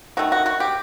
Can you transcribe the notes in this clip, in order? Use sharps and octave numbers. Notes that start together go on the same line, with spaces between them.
D#3 A3 F#4
F#4
F#4
G4